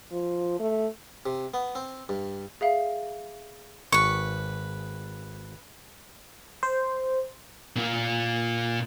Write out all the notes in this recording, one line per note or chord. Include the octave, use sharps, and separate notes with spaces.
F3
A3
C3
B3
C4
G2
G#4 E5 F5
G#1 B4 C#6
C5
A#2 F4